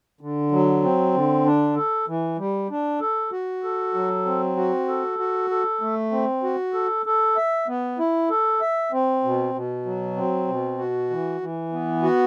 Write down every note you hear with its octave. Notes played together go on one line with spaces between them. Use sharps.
D3
F#3
C4
D3
D4
A4
E3
G3
D4
A4
F#4
A4
F#3
C4
F#4
A4
F#4
A4
A3
C4
F#4
A4
A4
E5
B3
E4
A4
E5
C4
B2
B2
F#3
C4
B2
F#4
E3
E3
B3
F#4